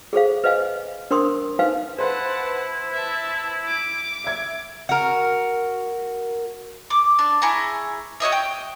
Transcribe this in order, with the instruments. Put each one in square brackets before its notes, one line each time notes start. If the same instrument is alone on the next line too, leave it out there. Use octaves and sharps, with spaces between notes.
[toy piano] G#4 A4 C5 F5
B4 C5 D#5 F5 G#5
D4 A#4 C5 C6 C#6 D#6
D#4 B4 C5 F5 G#5
[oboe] E4 [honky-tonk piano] B4 C5 [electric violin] F#5 A5
[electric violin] E5 A5
D6
[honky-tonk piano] E5 G#6
[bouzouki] F#4 A#4
[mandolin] D6
D4
E4 G#4 A#5 C#6
F#4 C#5 D#5 E5
G5